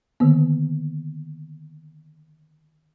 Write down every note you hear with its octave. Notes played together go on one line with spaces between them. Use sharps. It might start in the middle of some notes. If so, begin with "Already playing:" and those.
D3 D#3 A#3 B3